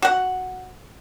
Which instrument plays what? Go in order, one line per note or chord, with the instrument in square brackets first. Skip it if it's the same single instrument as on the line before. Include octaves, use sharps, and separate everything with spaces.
[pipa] F#4 F#5